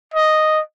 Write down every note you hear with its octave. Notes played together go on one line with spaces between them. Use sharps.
D#5